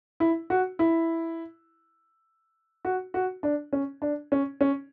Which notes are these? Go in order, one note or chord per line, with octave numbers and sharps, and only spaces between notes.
E4
F#4
E4
F#4
F#4
D4
C#4
D4
C#4
C#4